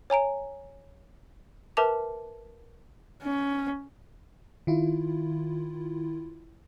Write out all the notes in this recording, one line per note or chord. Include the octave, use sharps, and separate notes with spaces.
C#5 G#5 A#5 D7
A#4 B4 E5 A5 D6 F7
C#4
D#3 E4 F4